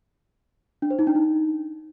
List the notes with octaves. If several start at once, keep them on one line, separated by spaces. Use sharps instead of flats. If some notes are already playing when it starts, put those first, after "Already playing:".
D4
C5
D#4
D4
D#4